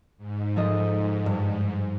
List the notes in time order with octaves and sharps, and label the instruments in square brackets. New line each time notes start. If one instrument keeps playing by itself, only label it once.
[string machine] G#2
[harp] F3 A4 D#5
G2